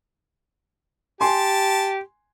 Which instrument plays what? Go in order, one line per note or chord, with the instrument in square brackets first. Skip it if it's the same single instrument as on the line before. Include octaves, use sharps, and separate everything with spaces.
[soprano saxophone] G4 [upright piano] G#5 C6 [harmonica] A5